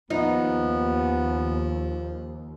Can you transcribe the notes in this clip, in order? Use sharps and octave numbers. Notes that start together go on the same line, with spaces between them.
D#2 F3 B3 D#4